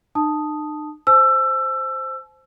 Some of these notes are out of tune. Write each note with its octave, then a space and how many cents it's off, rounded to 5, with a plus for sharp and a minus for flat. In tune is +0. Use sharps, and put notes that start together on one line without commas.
D#4 -45 A5 +0 D#6 +0
C5 +0 A5 -45 E6 +25